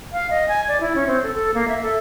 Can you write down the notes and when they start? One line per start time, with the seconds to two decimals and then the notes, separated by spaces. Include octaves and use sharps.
0.13 F5
0.30 D#5
0.48 G#5
0.68 D5
0.81 E4
0.95 C#4
1.07 C4
1.23 A4
1.35 A4
1.54 A#3
1.68 E5
1.83 A4